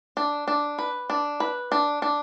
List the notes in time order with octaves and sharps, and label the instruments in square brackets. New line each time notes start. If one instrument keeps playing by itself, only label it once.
[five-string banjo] D4
D4
B4
D4
B4
D4
D4